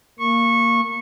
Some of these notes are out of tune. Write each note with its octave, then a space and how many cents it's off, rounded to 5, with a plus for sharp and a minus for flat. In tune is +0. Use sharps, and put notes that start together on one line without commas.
A#3 -10 C#6 -15